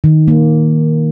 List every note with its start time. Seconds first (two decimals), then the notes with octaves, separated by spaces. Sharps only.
0.04 D#3
0.28 A#3